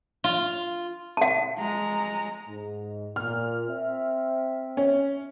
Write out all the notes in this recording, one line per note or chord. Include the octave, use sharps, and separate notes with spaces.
F4
F#5 A5
G#3 A#5
G#2
A#2 F6
C4 E5
C#4